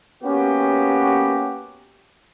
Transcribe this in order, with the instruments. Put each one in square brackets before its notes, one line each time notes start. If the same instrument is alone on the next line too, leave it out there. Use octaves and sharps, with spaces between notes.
[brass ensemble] A#3 B3 C#4 F#4 G4